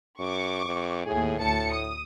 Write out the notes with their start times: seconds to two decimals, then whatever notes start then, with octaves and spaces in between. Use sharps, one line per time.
0.19 F#2 C#6 D6
0.65 F2
1.06 D#2 A2 G#4
1.40 D2 A2 A5 C#7
1.73 D#6